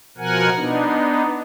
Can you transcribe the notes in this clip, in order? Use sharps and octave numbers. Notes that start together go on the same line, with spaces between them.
B2 F3 A#4 F#5 G#5
B3 D4 D#4